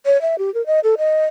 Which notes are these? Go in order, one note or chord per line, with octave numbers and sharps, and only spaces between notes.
C#5
E5
G4
A#4
D#5
A4
D#5